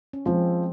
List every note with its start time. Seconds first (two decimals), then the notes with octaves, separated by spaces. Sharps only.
0.13 C#4
0.26 F3 G#3 C4